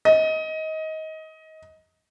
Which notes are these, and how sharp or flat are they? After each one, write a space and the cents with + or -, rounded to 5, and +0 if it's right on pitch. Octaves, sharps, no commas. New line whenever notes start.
D#5 +20